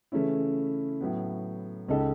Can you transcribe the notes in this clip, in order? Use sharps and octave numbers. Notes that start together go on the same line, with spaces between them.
C#3 E3 A3 C#4 E4
A2 F#3 B3
C#2 C#3 G#3 D#4 A4